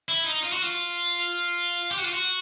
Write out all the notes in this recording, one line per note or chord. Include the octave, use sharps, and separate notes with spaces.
E4
D#4
F4
F#4
F4
G4
F#4
F4
F#4